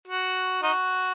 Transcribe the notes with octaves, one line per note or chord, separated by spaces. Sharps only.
F#4
D#4 F#4